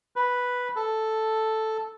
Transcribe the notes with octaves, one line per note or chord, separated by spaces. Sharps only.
B4
A4